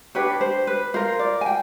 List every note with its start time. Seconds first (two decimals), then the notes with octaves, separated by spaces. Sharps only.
0.15 D4 G4 B4 C#5
0.41 C5
0.67 B4
0.94 F4 A#4 C5
1.19 D5
1.41 G#5
1.46 G5